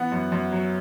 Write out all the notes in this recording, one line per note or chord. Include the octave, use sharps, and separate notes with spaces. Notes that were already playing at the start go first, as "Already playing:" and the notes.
Already playing: E3 B3 F#5
F#2
F#2
F#3